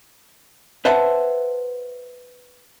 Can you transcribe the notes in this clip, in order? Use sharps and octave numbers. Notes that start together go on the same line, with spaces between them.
B4 C5 E5 F#5 A5